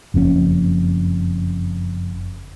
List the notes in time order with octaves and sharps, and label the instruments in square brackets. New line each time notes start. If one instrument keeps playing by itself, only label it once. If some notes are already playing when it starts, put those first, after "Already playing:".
[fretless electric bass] F#1 F2 C#3 C#4